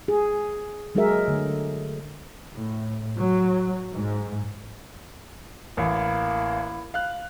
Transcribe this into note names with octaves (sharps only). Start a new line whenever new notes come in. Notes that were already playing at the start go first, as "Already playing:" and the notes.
G#4
F#3 G#3 F#4 G#4 A#4 E5
D3 A3
A2
F#3
G#2
A1 A#3 E4
F5 F#6